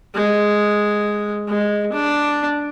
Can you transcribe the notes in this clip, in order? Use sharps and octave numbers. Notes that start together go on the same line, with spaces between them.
G#3
G#3
D4